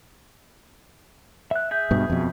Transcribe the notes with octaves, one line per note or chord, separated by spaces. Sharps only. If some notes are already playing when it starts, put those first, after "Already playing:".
E5 F#6
G#4 E5 G6
G2 B2
F2 B2